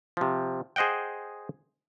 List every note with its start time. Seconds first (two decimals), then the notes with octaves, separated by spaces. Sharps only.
0.17 C3 F3
0.76 G#4 C5 D#5 F#5 G5